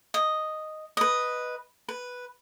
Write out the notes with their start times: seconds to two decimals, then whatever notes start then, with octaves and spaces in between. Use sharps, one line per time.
0.14 D#5
0.97 B4 D#5
1.88 B4